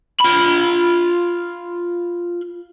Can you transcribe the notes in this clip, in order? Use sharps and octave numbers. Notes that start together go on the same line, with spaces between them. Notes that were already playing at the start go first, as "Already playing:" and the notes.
F4 B5